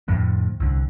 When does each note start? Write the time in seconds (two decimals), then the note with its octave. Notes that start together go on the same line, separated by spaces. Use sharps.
0.08 F2 A2 D3
0.60 C2 D3